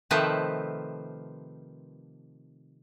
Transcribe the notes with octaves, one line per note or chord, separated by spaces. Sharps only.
C3 D#3 F3 A3 C4 B4